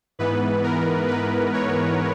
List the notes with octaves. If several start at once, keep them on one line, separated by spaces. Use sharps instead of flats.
G#2 E3 B3 B4
A#4
B4
C#5